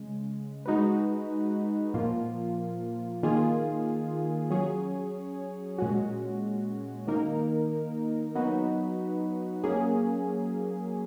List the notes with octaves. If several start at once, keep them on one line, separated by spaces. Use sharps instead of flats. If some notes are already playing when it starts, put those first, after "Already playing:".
Already playing: C#3 G#3
G#3 D#4 F#4 B4
A#2 F3 A#3 F4
D#3 A#3 F4 G#4
F#3 C#4 G#4 C#5
A#2 G#3 C#4 F#4
D#3 A#3 D#4 A#4
F#3 B3 D#4 F#4 B4
F#3 A#3 C#4 G#4